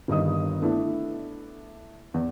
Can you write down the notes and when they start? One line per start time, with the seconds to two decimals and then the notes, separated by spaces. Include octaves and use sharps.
0.08 G1 G2 D#3 D#5 D#6
0.62 A3 B3 D4 E4
2.14 E2